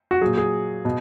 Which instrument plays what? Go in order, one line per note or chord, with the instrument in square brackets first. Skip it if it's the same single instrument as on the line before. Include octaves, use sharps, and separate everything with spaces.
[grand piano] F#4
A#2 F#3 G#4
G#4
B2